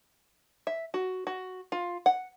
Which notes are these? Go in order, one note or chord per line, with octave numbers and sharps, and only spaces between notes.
E5
F#4
F#4
F4
F#5